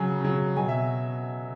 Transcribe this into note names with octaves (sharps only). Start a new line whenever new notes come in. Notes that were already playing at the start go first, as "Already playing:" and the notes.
Already playing: C#3 F#3 G#5
C#3 F#3
B2 F#3 G#5
E5